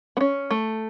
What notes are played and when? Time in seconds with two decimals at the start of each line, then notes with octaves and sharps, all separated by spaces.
0.17 B3
0.21 C#4
0.51 A3